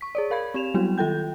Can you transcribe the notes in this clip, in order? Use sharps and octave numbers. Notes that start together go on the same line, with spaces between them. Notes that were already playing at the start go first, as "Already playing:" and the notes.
C#6 B6
G#4 C#5 D5
A#4 F5 B5 G#6
C4 G4 E7 F7
F#3 G3 B3 E4 F#4
D#3 F4 A4 G5 G6